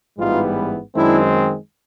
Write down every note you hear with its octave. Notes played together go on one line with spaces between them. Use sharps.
A1 G#2 E3 G3 B3 D#4 F4
F#2 D#3 G#3 C4 D4 E4